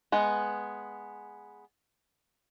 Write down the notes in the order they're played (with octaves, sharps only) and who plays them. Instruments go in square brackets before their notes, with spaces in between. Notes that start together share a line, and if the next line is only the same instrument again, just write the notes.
[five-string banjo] G#3 B3